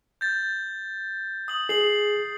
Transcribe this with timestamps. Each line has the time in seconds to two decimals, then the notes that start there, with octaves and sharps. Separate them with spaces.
0.21 G6 A6
1.48 D#6 F#7
1.69 G#4 C7 F#7